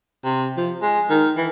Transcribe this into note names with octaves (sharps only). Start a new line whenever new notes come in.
C3
F3
G#3
D#3
E3